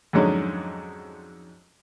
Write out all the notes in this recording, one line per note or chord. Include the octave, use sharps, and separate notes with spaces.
F2 G#2 D3 F#3 G#3 C#4